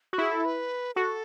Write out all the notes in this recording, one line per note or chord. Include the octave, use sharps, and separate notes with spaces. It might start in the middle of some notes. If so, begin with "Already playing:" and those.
F#4
E4 G#4
A4
B4
F#4 A4